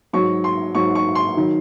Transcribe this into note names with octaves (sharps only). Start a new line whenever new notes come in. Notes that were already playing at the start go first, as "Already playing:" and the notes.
G#2 F#3 C#6
C6
G#2 F#3 C#6
C#6
C6
D#3 F#3